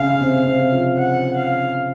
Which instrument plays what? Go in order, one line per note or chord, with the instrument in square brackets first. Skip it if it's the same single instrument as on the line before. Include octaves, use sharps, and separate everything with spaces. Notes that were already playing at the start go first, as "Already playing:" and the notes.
Already playing: [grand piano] C#3 [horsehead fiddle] F5
[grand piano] C3
C3
F3
[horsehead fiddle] F#5
F5